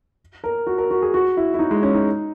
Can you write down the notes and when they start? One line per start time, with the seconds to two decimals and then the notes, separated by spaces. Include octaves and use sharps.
0.44 A#4
0.67 F#4
0.78 A#4
0.91 F#4
1.02 G#4
1.14 F#4
1.37 E4
1.54 E4
1.59 D#4
1.71 G#3
1.83 C#4
1.94 D#4